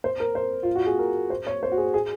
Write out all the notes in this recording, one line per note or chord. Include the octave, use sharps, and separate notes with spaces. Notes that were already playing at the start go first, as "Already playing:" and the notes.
C5
A#4
C5
F4
F#4
G#4
A#4
C5
C#5
C5
F#4
G#4
G#4